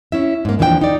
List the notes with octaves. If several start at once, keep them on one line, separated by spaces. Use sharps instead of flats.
C#4 E4 E5
G#2 A#3
D#2 E3 F3 D4 D#5 G5
D#4 D5